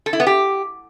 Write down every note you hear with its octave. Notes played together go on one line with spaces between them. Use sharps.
A4
E4
B3
G4